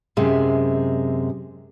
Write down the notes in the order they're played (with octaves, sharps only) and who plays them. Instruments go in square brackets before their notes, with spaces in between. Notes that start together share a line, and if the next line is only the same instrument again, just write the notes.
[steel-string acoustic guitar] F#2 C3 G#3